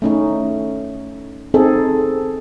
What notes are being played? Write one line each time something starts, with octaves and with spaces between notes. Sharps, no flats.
A3 C#4 D#4
C4 D#4 G#4 A4